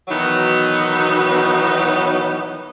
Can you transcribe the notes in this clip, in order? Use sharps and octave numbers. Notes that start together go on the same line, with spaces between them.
B2 D#3 E3 F#3 B3 D#4